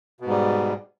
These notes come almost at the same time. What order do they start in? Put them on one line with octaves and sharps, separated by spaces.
B2 G#2 G3